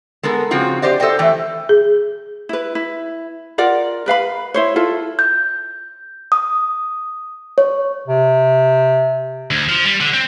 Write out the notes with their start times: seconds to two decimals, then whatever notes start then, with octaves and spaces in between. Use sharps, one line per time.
0.23 G#3 B3 A4 A#4
0.51 C#3 F3 C4 F4 F#4
0.82 G4 C5 D5 D#5
1.00 A4 C5 D5 D#5 G5
1.19 E2 E3 A3 G5
1.69 G#4
2.49 E4 B4
2.75 E4
3.58 F4 A#4 D5 F#5
4.06 A#4 B4 F5 B5
4.54 E4 C5 C#5
4.76 E4 F4 A4
5.19 G6
6.32 D#6
7.58 C#5
8.08 C3
9.51 D2
9.69 F3
9.85 G3
10.01 D3
10.14 C4